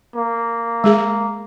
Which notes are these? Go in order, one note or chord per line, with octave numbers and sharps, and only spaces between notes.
A#3
G#3 G#4